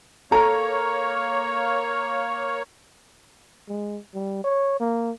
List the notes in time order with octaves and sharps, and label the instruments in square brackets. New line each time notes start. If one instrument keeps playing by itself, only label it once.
[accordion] A#3 C#5 [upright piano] A4 A#5
[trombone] G#3
G3
C#5
A#3